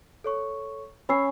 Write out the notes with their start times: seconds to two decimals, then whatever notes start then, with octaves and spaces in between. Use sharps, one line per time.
0.24 A4 C#5 C#6
1.09 C#4 B5 E6 C7